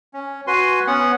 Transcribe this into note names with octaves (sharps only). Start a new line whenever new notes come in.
C#4
F#4 B4 G#5 C6
B3 C#4 F#5